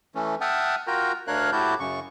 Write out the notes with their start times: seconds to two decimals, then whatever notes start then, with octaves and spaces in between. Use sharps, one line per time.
0.15 E3 A3 C#4
0.41 E5 F#5 G5 A5 D#6 F6
0.87 F4 F#4 A#4 G5 A#5
1.27 D2 D4 A#4 C#5 F5 F#6
1.52 A2 E4 F#4 G4 A5 G6
1.80 F#2 C#3 C#6